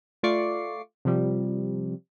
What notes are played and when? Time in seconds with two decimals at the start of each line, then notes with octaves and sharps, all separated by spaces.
0.23 A3 F4 D5 C#6 D6 C7
1.05 C3 F3 G3